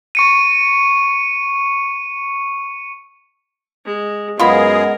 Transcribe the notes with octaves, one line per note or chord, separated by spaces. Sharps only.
C#6 C#7 D#7
G#3
F#2 G#3 B3 F4 G#4 A#4 B5